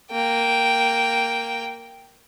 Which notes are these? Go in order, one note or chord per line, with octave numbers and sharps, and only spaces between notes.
A#3 G5